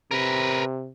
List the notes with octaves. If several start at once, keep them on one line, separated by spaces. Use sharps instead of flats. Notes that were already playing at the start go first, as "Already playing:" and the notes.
C3 A#4 B4